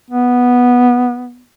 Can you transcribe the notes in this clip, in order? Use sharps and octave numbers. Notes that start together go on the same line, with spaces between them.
B3